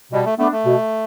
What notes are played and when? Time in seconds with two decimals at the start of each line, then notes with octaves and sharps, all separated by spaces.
0.12 B2 G3
0.25 A3
0.39 A3 B3 D4
0.52 A3
0.65 B2